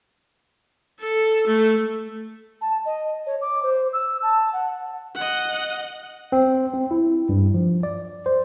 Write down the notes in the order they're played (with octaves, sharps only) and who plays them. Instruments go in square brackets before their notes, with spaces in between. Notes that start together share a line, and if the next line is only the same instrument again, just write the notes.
[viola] A4
A3
[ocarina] A5
D#5
C#5
D6
C5
E6
A5
F#5
[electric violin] D#5 F#5
[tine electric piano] C4
C4
E4
G2
F3
D5
C5